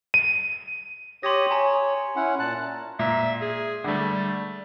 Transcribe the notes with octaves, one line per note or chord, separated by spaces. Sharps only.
D#7
G4 C#5 C6 D#6 A#6
C#5 G#5 A#5
C#4 E4 F#5
A#2 A5 F#6
A#2 E5
G#4
D3 G3 A3